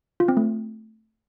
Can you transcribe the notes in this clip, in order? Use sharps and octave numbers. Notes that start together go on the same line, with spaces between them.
F4
C4
A3